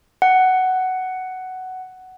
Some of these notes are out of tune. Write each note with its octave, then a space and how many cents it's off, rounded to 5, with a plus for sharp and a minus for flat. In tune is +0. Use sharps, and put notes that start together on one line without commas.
F#5 +10